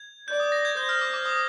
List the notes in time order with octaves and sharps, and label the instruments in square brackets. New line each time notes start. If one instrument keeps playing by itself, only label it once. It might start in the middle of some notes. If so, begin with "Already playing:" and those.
Already playing: [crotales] G#6
[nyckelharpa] D5 [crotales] G6
[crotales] D#6
A#6
G#6
[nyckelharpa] C5 [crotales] G6
[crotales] F6
D6
D6
D#6